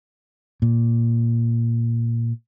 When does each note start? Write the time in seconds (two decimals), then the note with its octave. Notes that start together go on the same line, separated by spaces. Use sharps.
0.62 A#2